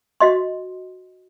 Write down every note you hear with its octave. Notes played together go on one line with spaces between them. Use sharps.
F#4 D#5 C6